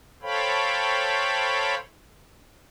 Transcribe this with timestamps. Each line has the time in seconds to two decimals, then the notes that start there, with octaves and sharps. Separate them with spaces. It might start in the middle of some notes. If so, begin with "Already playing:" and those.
0.22 A4 C5 C#5 F5 G5 B5